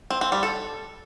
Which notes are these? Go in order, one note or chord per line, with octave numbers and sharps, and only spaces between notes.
C4
C4
G3
A4